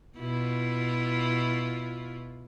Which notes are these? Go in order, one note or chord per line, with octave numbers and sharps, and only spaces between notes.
B2 E4 F4